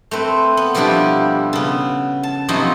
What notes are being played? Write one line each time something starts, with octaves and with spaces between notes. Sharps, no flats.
A3 C4 B4
B3
B2 F3 G3 D4 E4 G4
C#3 B3
A5
C3 F3 F#3 B3 D#4 G#5